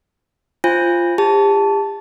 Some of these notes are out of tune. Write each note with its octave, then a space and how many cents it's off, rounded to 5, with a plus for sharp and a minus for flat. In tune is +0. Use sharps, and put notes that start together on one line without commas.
F4 -10 C5 +5 G#5 -30
G4 +40 A5 +0